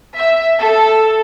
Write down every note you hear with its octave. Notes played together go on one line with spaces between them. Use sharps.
E5
A4